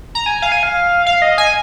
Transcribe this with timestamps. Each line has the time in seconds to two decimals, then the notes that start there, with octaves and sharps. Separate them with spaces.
0.15 A#5
0.26 G#5
0.42 F5
0.52 G#5
0.63 F5
1.06 F5
1.22 D#5
1.38 G#5